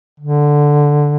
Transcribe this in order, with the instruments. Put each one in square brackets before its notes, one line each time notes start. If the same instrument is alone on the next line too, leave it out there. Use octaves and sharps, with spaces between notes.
[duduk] D3